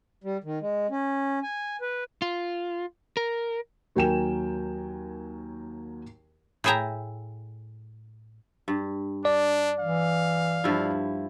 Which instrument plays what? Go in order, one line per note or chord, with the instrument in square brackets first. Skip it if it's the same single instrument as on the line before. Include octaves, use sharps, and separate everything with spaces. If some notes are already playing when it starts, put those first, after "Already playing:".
[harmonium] G3
D#3
G#3
C#4
G#5
B4
[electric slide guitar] F4
A#4
[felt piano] D#2 F#3 A#4 G5 G#5 E7
[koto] A2 E4 G#4 E5 G5 A#5
[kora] G2
[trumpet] D4 [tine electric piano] D5
[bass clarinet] E3 [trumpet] F5
[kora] G2 F3 E4